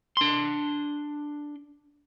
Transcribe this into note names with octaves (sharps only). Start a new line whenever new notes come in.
D4 C6